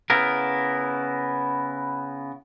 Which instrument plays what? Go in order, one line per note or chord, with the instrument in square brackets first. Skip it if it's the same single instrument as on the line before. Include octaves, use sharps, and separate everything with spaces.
[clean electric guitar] C#3 B3 E4 A#4